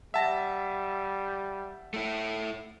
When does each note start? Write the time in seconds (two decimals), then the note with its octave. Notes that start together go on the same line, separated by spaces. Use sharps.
0.14 G3 E5 F#5 A5 A6 A#6
1.94 A3 E4